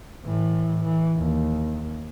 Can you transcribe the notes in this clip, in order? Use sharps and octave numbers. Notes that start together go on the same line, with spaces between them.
A2 E3
E3
D#2